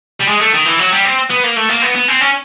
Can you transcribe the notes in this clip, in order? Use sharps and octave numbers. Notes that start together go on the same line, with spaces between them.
G3
G#3
A3
D#3
E3
F#3
G3
C4
B3
A#3
A3
A#3
B3
B3
C4
C#4